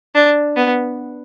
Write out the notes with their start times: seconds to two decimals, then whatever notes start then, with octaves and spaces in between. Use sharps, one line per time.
0.15 D4
0.56 B3